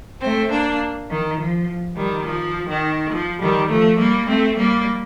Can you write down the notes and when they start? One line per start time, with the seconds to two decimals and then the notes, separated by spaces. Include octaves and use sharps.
0.22 A3 C4
0.51 A#3 D4
1.10 D#3
1.38 F3
1.96 D#3 G3
2.26 F3
2.68 D#3
3.12 F3
3.40 D#3 G3
3.70 F3 A3
3.98 G3 A#3
4.28 A3 C4
4.57 G3 A#3